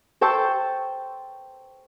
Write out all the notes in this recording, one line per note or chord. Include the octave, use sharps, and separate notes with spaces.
A4 C5 G5 A5 C#6 E6